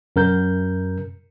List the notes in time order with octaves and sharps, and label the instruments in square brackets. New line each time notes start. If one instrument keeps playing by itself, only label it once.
[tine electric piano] F#2 A#4 G6